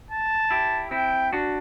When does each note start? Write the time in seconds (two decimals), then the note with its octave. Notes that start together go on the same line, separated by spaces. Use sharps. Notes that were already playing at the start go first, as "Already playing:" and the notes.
0.11 A5
0.51 E4 G4
0.91 C4 E4 G5
1.33 D4 F#4